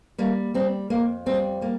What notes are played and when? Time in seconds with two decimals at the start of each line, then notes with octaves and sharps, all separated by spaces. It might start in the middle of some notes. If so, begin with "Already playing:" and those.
0.18 G3 A#3
0.54 G3 C4
0.90 F2 A#3
1.26 G3 C4
1.61 G3 A#3